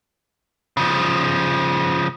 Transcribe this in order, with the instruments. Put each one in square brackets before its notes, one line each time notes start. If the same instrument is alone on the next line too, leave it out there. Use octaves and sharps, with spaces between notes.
[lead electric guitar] C#3 F3